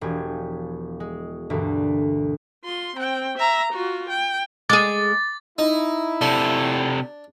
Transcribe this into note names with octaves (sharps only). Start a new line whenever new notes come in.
E1 F3 G4 G#5
G#3
D2 G2 B2 E3 A#3
F4 C6
C4 G5
E5 A#5
F4 F#4
G5
G#3 G#4 D6 A6
D#4 E4
C3 D4 A4